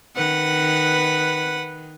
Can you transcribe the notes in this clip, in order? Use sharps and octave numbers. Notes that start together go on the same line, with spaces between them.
D#3 B4 F#5